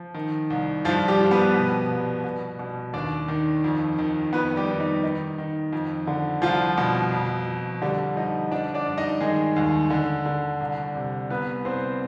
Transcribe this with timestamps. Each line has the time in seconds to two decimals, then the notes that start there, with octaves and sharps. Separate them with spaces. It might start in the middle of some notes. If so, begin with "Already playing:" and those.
Already playing: F3
0.14 D#3
0.50 C2
0.85 G2 F3 F4
1.08 G3 G4
1.20 F3
1.31 B3 B4
1.54 B2
1.89 C2
2.24 B2
2.59 B2
2.93 D#2 D4 D5
3.28 D#3
3.64 F2
3.98 D#3
4.33 F2 B3 B4
4.56 G3 G4
4.69 D#3
4.80 D#4
5.03 D#3 D#4
5.38 D#3
5.73 F2
6.07 D3
6.42 C2 F3 F4
6.78 B2
7.12 F2
7.47 F2
7.82 D3 G3 G4
8.16 F3 D#4 D#5
8.51 F3 D4 D5
8.74 D4 D5
8.87 G2
8.98 D#4 D#5
9.21 D#3 G#3 G#4
9.56 D#2
9.90 D3
10.26 D3
10.60 C2
10.95 C3
11.30 C2 B3 B4
11.65 C2 C4 C5